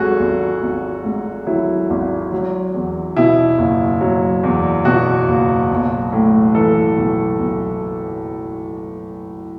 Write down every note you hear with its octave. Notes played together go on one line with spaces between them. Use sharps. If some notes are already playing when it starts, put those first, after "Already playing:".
Already playing: G#1 G#2 F#3 F#4 G#4 A4
G#1
G#1
G#2
F#3 E4
G#1
F#3
E2
B2 E4
F#1
F#3
E2
B2 F#4
F#1
B1
A2
E3 A4
B1
B1